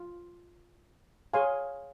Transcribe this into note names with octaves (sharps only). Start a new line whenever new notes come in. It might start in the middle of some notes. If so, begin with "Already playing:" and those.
Already playing: F4
G#4 C#5 F5 G#5 C6